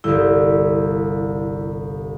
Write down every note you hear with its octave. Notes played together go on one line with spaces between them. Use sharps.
G1 C2 E4